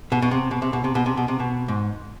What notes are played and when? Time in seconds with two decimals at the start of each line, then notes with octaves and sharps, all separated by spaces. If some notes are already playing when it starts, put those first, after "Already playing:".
0.12 B2
0.22 B2
0.31 C3
0.51 B2
0.62 C3
0.73 B2
0.84 C3
0.95 B2
1.06 C3
1.17 B2
1.28 C3
1.40 B2
1.68 G#2